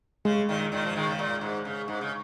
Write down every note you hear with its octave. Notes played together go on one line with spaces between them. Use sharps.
C#3 G#3
A#2 D#3
A#2 D#3
F3
D#3 G#3
C#3
A#2
G#2
C#3
G#2
C#3